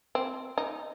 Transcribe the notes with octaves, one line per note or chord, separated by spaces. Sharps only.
C4
D#4